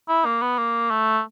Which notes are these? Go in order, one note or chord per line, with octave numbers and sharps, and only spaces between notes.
E4
A#3
B3
A#3
A3